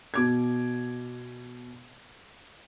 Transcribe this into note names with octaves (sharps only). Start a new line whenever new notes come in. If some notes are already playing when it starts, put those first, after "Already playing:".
B2 D6 G#6